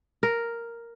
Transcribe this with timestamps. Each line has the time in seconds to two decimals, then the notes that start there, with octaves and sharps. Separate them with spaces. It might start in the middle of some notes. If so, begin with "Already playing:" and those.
0.23 A#4